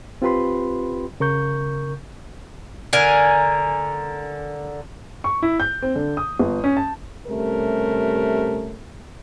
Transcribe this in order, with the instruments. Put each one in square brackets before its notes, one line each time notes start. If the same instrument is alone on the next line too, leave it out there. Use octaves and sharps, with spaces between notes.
[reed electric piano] C4 F4 G4 B4 B5 C6
C#3 A#4 C#6 G6
[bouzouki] D3 A#4 G#5
[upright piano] C#6
E4
G6
C4
D3
D#6
G1
C#4
A5
[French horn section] C3 G3 A3 C#4 A#4